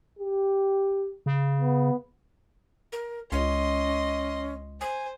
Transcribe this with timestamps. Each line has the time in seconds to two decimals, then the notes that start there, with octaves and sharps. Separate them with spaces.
0.19 G4
1.26 C#3
1.62 B3
2.92 A#4
3.32 C#2 C#4 D#5 C6
4.81 C5 G#5